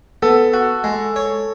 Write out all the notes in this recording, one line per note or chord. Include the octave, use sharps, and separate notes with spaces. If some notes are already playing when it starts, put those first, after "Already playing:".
B3 A4
F#4
G#3
C#5